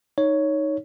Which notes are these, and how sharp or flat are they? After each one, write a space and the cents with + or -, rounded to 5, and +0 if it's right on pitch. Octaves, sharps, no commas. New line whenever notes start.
D#4 +0 C#5 +5